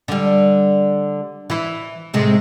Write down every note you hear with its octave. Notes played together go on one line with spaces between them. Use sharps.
D3 G3
E3 E4
A2 C3 G#3